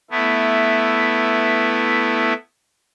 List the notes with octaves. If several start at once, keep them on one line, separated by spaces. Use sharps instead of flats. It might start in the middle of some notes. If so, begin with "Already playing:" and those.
A3 B3 E4